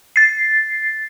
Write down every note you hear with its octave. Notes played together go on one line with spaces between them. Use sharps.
A6 C7